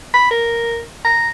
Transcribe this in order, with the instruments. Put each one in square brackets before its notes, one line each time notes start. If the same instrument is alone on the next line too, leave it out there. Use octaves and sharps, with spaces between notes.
[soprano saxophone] B5
A#4
A#5